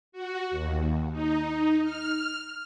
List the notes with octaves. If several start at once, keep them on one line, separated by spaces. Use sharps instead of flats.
F#4
D#2
D#4
F6